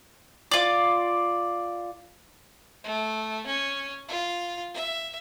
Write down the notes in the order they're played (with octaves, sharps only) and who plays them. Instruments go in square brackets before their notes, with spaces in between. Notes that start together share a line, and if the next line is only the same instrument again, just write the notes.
[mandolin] F4 D5
[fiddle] A3
C#4
F4
E5